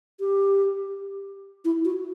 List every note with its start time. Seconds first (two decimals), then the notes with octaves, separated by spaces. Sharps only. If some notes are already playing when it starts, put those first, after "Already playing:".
0.20 G4
1.65 E4
1.85 F#4